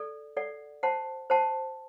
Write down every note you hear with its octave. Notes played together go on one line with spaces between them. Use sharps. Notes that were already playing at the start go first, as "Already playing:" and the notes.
Already playing: A4 D5
A4 D5 F#5
C5 F#5 A5 C6
C5 F#5 A5 C6